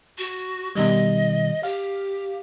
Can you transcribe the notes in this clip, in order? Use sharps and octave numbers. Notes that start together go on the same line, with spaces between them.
F#4
B2 D#3 G3 D#5
G4 F5